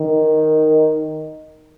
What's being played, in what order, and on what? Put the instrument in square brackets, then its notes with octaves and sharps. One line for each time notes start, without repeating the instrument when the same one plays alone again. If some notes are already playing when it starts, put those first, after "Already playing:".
Already playing: [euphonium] D#3